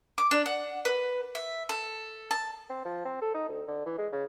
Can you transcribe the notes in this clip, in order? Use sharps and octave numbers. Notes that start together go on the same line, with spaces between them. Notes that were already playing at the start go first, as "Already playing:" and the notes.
D6
D4
F#5
B4
E5
A4
A5
C4
F3
C4
A4
D#4
D2
D3
E3
G#3
C#3